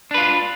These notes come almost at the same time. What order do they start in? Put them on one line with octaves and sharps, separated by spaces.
D4 B4 F4